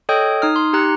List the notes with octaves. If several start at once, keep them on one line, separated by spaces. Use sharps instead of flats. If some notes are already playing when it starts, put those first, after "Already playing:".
A4 C#5 D#5 G5 D#6 G6
D#4 D#6 F6
C6
D#4 G4 A#5 F#6 C#7